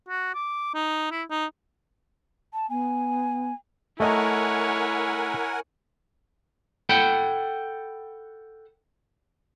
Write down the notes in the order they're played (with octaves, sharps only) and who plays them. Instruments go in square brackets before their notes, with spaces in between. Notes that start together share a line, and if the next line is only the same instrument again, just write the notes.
[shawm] F#4
D6
D#4
E4
D#4
[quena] A5
[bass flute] B3 [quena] G#5
[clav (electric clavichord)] A3 D#5 A#5 [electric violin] E4 C#5 [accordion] A#4 F#5 G#5
[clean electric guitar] A4 F#5 G5 B5